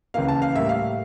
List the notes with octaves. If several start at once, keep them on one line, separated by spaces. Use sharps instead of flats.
C#2 C#3 E3 A#3 F5
A5
F5
A2 G3 A#3 E5
F5